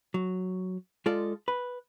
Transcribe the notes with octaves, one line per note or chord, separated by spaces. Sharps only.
F#3
G#3 F4 A4 D5
B4